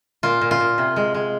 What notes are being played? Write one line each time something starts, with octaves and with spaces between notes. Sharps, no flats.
A#2 F4
A#2
F4
A#2
C3
G#3
G#3